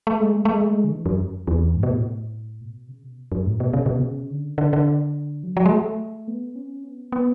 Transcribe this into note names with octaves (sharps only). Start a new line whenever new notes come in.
A3
G#3
A3
G#3
A3
G#3
A3
G#3
D3
E3
F#2
E2
G#2
B2
A2
B2
C#3
B2
F#2
A2
B2
C#3
B2
C#3
D3
D3
D3
F#3
F#3
G#3
A3
B3
C#4
B3
B3